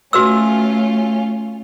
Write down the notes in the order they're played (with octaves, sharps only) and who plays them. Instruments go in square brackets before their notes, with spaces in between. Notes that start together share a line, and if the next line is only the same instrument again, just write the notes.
[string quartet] A3 C#4 F4 [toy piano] F#4 B4 E6